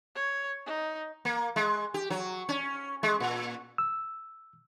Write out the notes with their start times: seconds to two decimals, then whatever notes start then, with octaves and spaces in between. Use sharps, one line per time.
0.16 C#5
0.66 D#4
1.25 A#3
1.56 G#3
1.94 G4
2.10 F#3
2.49 C#4
3.03 G#3
3.20 A#2
3.78 E6